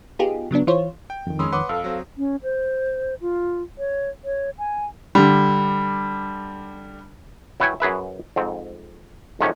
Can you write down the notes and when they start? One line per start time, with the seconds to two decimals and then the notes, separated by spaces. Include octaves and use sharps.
0.19 B3 D#4 F4 G4 G#4
0.51 C#3 F#3 B3 D4
0.67 E3 F4 C5 C#5
1.10 G5
1.27 F2 D#3
1.39 G#3 C#4 B5 C6 D#6 E6
1.52 B4 C#5 F#5 C6 D6 D#6
1.69 F2 A4 F5 E6
1.84 F#3 C4
2.18 C#4
2.43 C5
3.21 F4
3.78 C#5
4.24 C#5
4.58 G#5
5.15 D3 G3
7.60 F#3 E4 B4 C#5 G5 G#5
7.80 F#2 G#4 B4 E5
8.36 F2 G#2 C4
9.41 F2 G#2 C3 D#3 A3 C#4